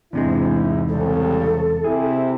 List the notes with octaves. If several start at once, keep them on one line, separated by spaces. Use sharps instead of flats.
E2 G#2 C3 G#3 D4 E4
C2 C#3 A4
C3 E4 G#4